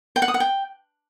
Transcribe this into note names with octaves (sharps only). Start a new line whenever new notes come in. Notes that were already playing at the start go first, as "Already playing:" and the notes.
G5
F#5
D#6
F#5
G5